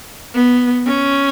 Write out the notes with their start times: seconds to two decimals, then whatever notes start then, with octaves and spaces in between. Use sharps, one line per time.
0.34 B3
0.85 C#4